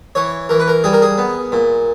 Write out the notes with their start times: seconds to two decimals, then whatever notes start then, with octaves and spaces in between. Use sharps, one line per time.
0.15 E3 C#5
0.49 E3 A#4
0.60 B4
0.68 A#4
0.84 G3 G#4
0.93 A#4
1.02 G#4
1.18 B3
1.52 A#2